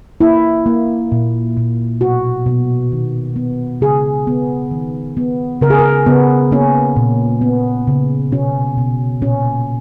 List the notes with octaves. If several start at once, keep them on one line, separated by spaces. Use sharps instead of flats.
A#3 E4
A#3
A#2
A#2
B2 F#4
B2
D#3
B3
C#3 G#4
B3
D#3
B3
C#3 A#4
G#4
A#4
C#3 B3
A#3 C#4
A#2
B3
C#3
B2 C#4
B2
A#2 C#4